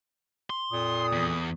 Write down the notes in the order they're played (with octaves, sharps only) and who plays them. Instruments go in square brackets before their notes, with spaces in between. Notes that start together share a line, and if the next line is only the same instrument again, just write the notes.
[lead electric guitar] C6
[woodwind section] F2 A#2 D#6
[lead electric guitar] E2